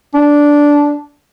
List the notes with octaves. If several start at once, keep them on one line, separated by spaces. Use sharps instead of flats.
D4